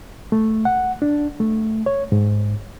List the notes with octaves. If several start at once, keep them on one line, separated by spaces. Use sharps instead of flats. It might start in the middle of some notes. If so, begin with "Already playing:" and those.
A3
F#5
D4
A3
C#5
G#2